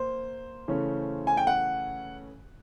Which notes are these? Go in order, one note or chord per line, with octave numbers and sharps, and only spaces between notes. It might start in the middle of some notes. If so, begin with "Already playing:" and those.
Already playing: A#3 C5
C#3 E3 A3 C#4
G#5
G5
F#5